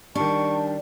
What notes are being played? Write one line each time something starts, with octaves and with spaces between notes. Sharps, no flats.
D#3 G3 D4 A5 C#6